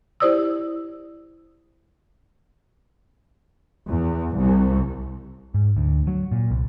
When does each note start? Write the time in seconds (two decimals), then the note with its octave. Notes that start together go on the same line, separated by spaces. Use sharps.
0.20 E4 G4 C5 D5 D#6 E6
3.87 E2
4.37 C2
5.54 G#2
5.77 D2
6.07 F#3
6.32 A#2
6.51 C2